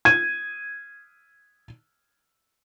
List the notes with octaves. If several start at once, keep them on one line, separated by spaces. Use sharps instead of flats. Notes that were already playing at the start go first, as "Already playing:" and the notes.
G#6 D#7